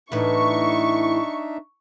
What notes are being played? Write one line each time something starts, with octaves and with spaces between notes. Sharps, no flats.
A2 E3 D4 D#4 B4 E5 C#6